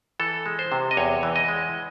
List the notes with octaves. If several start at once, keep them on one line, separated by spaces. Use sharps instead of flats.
E3 A4
G#3
C5
C3
D#5
E2 C#5
E3
D#5
G#3